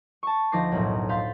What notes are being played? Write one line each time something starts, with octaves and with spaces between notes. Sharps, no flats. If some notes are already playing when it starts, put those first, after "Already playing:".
A5 C#6
D2 F3 D#4 D6 A#6 C7
B1 F#2 A2
F5 B5 C6 G6 A6